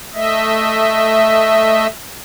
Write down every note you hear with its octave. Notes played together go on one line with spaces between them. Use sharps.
A3 D#5 E5